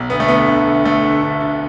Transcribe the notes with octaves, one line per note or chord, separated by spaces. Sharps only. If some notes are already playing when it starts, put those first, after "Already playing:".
Already playing: B1
D2 B3
A3
D2 B3
D3
D2
D2 A3
D3
D3
D3